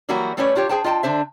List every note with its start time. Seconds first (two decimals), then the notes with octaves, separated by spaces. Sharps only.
0.09 E3 F#3 G3 A#3 E4 F#4
0.37 G3 A3 C#4 B4 C#5 D5
0.55 D4 F4 G4 C#5
0.69 G#4 C5 G5 A5
0.84 F4 D#5 G5 A5
1.03 D3 D4 C5 E5